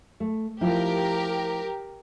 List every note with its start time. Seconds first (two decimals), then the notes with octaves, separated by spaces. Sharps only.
0.20 A3
0.61 F3 E4 G4 A#4